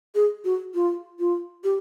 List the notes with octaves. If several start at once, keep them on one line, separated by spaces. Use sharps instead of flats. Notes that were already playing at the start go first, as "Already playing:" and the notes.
G#4
F#4
F4
F4
G4